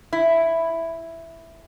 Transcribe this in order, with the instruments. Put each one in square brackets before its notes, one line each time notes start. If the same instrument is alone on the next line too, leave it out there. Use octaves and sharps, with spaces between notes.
[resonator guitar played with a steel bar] E4